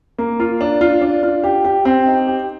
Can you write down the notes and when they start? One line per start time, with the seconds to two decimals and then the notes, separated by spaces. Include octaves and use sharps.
0.18 A#3
0.40 F4
0.61 D4
0.81 F4
1.01 D4
1.23 F4
1.44 G4
1.65 G4
1.85 C4
2.06 D#4
2.27 G4